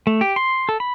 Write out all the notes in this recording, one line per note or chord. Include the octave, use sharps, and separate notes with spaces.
A3
G4
C6
A4
B5